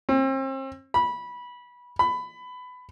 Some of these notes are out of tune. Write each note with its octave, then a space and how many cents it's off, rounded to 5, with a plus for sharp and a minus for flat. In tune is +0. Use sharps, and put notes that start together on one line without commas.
C4 +40
B5 -15
B5 +20